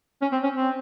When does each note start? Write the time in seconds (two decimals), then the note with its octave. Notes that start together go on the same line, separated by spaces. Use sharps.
0.22 C#4
0.32 C4
0.44 C#4
0.54 C4